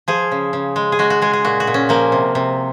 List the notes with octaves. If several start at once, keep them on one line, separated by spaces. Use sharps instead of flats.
F3 G#4
C#3
C#3
G#3
G#4
G#3 F#4
F#4
G#3 G#4
G#4
A#2 F#4
F#4
A#2
C#4
F3 A#3
C3
C3